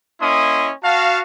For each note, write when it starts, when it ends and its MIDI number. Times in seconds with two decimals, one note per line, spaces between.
0.21 0.72 58
0.21 0.72 61
0.21 0.72 64
0.21 0.72 75
0.21 0.72 84
0.21 0.72 87
0.83 1.21 66
0.83 1.21 77
0.83 1.21 81